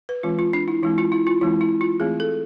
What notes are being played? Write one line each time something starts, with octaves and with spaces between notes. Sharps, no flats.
B4
E3 G#3 C4 F4
F4
D4
E4
E3 G#3 C4 E4
F4
E4
F4
E3 G#3 C4 E4
E4
F4
E3 A3 C4 G#4
A4